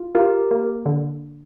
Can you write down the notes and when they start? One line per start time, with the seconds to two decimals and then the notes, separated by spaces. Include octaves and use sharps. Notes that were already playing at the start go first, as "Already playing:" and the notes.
Already playing: F4
0.15 F4 G4 A#4
0.51 A#3
0.86 D3